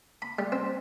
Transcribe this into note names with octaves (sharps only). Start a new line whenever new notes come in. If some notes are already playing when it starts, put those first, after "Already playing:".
B5
G3
C4